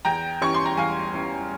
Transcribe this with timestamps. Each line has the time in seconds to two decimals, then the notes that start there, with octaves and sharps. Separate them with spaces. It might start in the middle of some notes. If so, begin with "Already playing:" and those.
0.05 E2 G5 A#5
0.41 E3 G3 C#4 C#6
0.54 C6
0.66 A#5
0.77 E2 F5 G#5
1.14 E3 G3 C#4